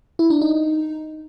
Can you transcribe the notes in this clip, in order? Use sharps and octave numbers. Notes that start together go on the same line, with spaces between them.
E4
D4
D#4